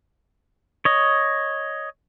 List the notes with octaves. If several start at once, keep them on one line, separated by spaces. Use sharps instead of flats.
C#5 D#5